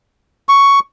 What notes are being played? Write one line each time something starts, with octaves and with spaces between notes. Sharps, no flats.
C#6